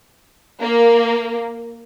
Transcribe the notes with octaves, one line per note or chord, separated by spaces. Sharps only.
A#3